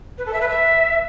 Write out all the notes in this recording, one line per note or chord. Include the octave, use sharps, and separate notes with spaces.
B4
A4
E5
B4
E5